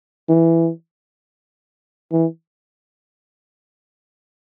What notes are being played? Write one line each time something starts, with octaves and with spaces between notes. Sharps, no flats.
E3
E3